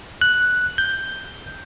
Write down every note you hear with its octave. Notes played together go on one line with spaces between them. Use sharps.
F#6
G6